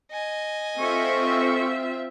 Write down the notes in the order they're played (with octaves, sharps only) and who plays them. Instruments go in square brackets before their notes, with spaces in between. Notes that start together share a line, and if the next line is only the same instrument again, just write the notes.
[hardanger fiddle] D#5 G#5
[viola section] C4 F4 E5 [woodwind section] A4 C#6